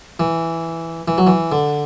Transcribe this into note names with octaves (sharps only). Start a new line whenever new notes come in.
E3
E3
F#3
E3
D3